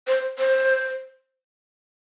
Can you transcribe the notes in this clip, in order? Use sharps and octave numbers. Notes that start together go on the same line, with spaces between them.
C5
C5